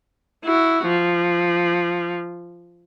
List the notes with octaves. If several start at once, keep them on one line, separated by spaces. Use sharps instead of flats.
E4 F#4
F3